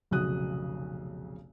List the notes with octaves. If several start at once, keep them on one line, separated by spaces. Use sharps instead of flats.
F1 B1 C#3 F#4 D#6 F#6